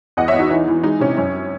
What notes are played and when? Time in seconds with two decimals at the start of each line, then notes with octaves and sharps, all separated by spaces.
0.17 E2 D#5 F#5
0.28 C#5 E5
0.34 E2
0.39 D#4 F#4
0.50 E3 D#4
0.68 E3
0.83 G#3 D#4
1.00 C3 C#4
1.17 F#2 C#4